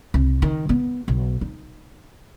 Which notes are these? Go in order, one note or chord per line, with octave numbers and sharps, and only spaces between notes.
C2
D#3
B3
B1
D#4